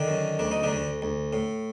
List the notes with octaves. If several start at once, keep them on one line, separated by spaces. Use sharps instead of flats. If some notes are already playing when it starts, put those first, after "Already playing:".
Already playing: D3 D#3 D4
F#2
D2 D4
D#4
D3 D4
D2
D2
A2